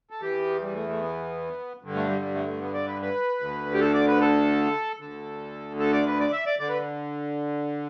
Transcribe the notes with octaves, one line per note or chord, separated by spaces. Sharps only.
A4
E2 E3 G4
G3
A3
A3
B3
G2 D3
A3
G3
G3
A3
A3
B3
D5
B4
B4
D2 D3
G4
A4
D5
B4
A4
D2 D3 A4
A4
D5
B4
D5
E5
D5
D3 D5
B4